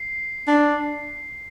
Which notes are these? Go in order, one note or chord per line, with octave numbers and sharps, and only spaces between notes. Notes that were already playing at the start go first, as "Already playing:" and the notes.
Already playing: C7
D4